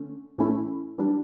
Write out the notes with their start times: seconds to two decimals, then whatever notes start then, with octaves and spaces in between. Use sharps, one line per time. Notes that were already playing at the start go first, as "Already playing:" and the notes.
Already playing: D3 A3 C#4
0.38 A2 E3 A3 C#4 E4
0.98 E3 G3 D4